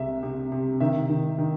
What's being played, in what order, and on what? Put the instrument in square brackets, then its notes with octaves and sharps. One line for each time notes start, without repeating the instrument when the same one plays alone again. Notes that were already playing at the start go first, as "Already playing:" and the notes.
Already playing: [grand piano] C2 C3 G#3 E5
C3
C3
D#3 E5
D#3
D#3